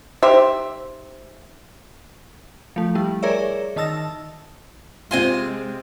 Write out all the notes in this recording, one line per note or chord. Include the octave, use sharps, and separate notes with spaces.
D#4 G4 C5 E5
F3 A3
G3 E4
G#4 A#4 C#5 D5 E5
D#3 D#4 A5 E6 A#6
C3 G#3 C4 F4 G#5 C6